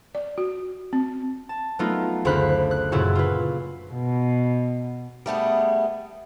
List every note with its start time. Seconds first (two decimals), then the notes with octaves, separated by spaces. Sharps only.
0.15 D5
0.38 F#4
0.93 C4
1.49 A5
1.79 F#3 A3 B3 D#4 F4 A#4
2.25 F#1 D2 C5 F5 B5 F#6
2.71 F#6
2.92 F#2 A#2 C#3 C#4 E4 F#4
3.15 F4 B4
3.90 B2
5.26 G3 A3 B3 G#4